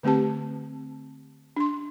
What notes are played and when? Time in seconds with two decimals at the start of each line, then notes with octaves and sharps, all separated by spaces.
0.03 D3 A3 C4 G4 A5
1.57 D4 C6